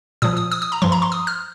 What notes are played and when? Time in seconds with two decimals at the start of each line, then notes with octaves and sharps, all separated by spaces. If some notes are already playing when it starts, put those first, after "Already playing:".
0.22 A#2 F3 D#6
0.37 D#6
0.52 D#6
0.62 D#6
0.72 A#5
0.82 G2 F3 C6
0.92 A#5
1.02 C6
1.12 D#6
1.27 F6